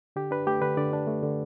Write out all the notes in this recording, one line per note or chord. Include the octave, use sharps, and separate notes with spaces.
D3 G4
D4 B4
A3 G4
D3 B4
D3 D5
D4
A3
D3